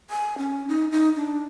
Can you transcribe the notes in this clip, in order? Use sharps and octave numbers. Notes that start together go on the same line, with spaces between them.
G#5
C#4
D#4
D#4
D4